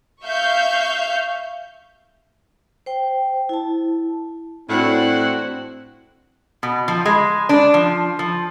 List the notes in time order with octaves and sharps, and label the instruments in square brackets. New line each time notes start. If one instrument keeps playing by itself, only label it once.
[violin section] E5 F5 C#6 G6
[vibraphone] C5 G5
E4 A5
[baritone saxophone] A2 [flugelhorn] C4 [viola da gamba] D4 E4 F#4 [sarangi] F#5
[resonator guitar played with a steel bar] B2
F3
G#3
D4
F3
F3